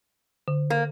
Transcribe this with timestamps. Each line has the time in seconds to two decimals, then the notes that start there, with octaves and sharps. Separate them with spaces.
0.48 D3
0.70 A#3